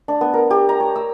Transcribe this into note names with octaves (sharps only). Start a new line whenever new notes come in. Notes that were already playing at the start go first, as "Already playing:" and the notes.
D4
B3
A#4
G4
A#5
C#5
E6